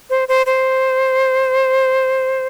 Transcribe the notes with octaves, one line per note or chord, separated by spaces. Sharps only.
C5
C5
C5